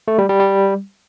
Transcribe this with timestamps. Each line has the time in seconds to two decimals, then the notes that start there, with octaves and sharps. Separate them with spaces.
0.08 A3
0.18 G3
0.29 G3
0.40 G3